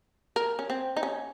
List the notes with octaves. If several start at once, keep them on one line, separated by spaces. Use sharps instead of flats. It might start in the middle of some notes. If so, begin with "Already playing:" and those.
A#4
C#4
C4
D#4
C#4